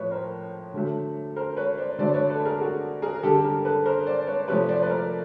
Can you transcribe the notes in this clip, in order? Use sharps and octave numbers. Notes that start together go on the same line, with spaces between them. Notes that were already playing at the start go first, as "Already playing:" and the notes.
Already playing: A2 F3 B4 C#5
A#4 C5
D3 F#3 A3
A#4 C5
B4 C#5
C5 D5
D3 F#3 A3 C5 D5
B4 C#5
A4 B4
G#4 A#4
F#4 G#4
G#4 A#4
A#4
D3 G3 G4 A4
A4
G#4 A#4
A4 B4
A#4 C5
C5 D5
B4 C#5
C3 F3 A3 B4 C#5
C5 D5
B4
A#4 C5